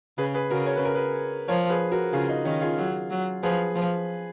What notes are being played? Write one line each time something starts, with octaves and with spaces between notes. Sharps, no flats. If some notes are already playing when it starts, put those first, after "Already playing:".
C#3 G#4 B4
G#4 B4
C#3 F#4 A#4
C#5
B4
A#4
G#4 B4
F3 A#4 C#5
G#4 B4
F#4 A#4
C#3 F4 G#4
D#4
D#3 C#4 F4
F4 G#4
F#3
F#3
F3 G#4 B4
F3